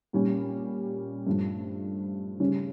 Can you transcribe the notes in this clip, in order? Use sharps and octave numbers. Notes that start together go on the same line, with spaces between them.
A#2 G3 C#4
G2 F3 A3
C#3 G3 C#4